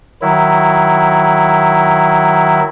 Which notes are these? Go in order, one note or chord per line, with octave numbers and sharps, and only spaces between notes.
D#3 F#3 E4